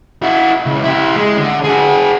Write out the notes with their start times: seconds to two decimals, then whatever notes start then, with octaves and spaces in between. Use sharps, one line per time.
0.22 E4 F#4
0.66 C#2
0.84 E4 G4
1.16 G#3
1.37 D3
1.64 F#4 G#4